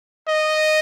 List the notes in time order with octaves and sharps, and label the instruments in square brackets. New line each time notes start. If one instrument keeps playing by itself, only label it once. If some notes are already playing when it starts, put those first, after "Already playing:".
[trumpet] D#5